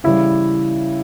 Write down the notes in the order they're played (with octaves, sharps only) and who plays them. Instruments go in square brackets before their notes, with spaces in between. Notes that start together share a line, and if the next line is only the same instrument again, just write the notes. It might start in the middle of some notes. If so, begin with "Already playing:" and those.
[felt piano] C#3 E3 G3 [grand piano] E4